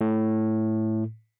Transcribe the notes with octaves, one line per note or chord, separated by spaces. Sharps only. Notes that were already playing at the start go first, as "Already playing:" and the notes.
A2